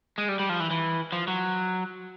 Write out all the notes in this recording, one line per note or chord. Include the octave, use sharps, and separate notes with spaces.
G#3
G3
G3
F3
E3
E3
F3
F#3